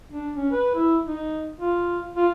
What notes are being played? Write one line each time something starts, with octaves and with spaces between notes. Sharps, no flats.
D4
C#4
B4
E4
D#4
F4
F4